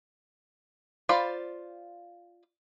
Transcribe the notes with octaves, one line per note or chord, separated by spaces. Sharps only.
F4 C5 D5 F5 B5